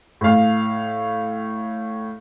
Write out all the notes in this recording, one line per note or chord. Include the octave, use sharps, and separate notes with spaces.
A2 F5